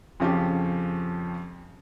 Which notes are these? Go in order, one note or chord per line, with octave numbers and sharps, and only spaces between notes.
F2 C#3 F3 C#4 G4